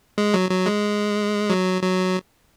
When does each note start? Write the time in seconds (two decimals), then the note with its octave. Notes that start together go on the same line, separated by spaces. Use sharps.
0.18 G#3
0.34 F#3
0.51 F#3
0.66 G#3
1.50 F#3
1.83 F#3